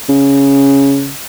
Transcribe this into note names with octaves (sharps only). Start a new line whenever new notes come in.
C#3